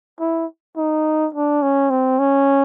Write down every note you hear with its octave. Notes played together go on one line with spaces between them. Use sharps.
E4
D#4
D4
C#4
C4
C#4